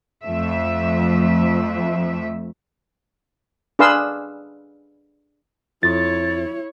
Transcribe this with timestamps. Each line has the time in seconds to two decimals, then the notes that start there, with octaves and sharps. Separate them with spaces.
0.25 F2 F3 A3 E5
3.79 D4 G#4 B4 F5 C6 E6
5.83 F2 E4 C#5 A6